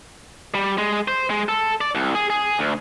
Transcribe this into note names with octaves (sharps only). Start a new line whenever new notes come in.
G3
G#3
C5
G#3
A4
D5
C2
G#4
G#4
D2